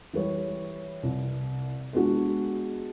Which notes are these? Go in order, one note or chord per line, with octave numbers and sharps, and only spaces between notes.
E3 G3 B4 C#5
C2
G#3 B3 D4 F#4